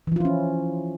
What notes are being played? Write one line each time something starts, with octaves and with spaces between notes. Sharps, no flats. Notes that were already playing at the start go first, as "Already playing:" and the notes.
E3 F3 C#4 E4 F4